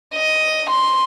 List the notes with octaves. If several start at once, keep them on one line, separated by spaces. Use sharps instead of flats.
D#5
C6